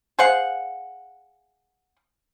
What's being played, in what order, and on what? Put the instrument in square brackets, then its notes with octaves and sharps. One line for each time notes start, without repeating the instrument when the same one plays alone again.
[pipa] G#4 C5 F5 F#5